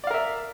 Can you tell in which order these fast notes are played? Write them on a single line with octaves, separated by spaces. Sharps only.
D5 F5 A#4 E5